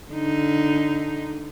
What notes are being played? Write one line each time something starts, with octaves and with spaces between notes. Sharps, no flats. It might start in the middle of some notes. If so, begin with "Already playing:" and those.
D3 D#4